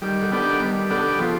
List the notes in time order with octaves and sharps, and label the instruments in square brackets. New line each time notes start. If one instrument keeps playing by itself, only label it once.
[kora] D#3 [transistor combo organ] G3
[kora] D3
[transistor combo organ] B3 D4 G4
[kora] D#3
[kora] D#3 [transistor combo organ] G3
[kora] D3 [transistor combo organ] B3 D4 G4
[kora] C#3 [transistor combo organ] F3